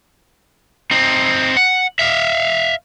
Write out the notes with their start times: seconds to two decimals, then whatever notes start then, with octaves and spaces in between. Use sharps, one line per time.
0.91 C4 D#4
1.57 F#5
1.99 E5 F5